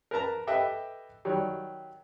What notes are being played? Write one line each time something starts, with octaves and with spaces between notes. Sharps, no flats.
A#4 B4 A5 A#5
G4 A4 B4 D#5 E5 G5
D#3 F#3 G3